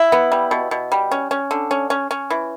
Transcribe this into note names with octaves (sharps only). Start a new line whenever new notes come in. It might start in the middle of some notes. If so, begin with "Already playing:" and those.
Already playing: E4
B3
G3
B2
B2
G3
C#4
C#4
D3
C#4
C#4
C#4
E3